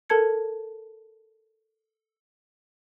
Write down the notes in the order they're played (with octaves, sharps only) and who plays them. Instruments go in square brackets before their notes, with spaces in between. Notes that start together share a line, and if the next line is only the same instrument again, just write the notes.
[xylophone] A4 A#4 A5 G#6 C#7